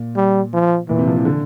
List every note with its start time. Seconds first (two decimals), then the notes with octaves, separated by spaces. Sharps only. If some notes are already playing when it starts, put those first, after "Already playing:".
Already playing: A#2
0.16 G3
0.53 F3
0.89 A#2 E3
0.99 C3
1.07 F3
1.16 E3
1.25 D3